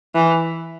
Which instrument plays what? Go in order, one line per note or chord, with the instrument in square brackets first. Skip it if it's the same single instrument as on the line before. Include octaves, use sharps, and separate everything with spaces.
[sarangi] E3